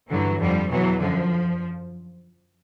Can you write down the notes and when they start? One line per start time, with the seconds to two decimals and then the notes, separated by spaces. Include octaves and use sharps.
0.09 G2 D3 E3 F#3
0.39 F2 D3 F3 G3
0.69 E2 B2 E3 F#3
0.99 F#2 D3 F3